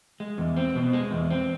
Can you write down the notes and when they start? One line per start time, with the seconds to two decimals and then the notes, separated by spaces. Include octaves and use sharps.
0.20 G#3
0.38 E2
0.56 C4
0.75 B2
0.93 G#3
1.11 E2
1.30 C4